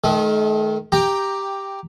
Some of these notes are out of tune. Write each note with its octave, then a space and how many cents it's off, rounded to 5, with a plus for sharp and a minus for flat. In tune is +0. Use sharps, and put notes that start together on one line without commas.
D#3 +0 A3 -40
G4 +0 G5 +10 A#5 +0